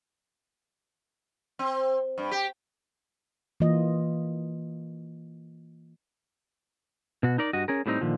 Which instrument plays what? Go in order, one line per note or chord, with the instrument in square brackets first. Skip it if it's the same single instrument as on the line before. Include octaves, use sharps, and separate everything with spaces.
[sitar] C4
G2
G4
[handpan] E3 A#3 F4 D#5
[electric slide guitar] B2 F#4
D#4 A#4 D5
G2 F#4 D#5
C#4 G#4 A#4
A2 G3 A3 C4 D#4
A#2 D3 D#3 F3